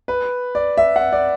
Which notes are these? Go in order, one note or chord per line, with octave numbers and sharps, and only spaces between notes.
B4
D5
E5
F#5
D5